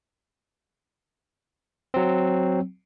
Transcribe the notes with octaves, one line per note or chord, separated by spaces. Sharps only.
F#3 C4